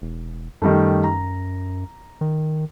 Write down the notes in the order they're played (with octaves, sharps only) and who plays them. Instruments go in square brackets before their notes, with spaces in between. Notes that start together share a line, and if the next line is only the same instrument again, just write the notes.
[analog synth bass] E1
[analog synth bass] F#2 [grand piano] D#3 G3 A3
[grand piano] A#5
[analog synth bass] D#3